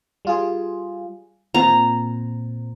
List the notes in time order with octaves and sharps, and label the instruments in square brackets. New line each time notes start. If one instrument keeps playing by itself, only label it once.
[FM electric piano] G3 F4 G#4
[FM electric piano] A#2 C4 [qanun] A#5